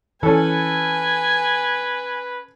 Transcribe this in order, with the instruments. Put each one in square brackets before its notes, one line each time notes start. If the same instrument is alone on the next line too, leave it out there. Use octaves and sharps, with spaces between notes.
[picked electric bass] E3 [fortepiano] C#4 A4 [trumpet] B4 [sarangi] G#5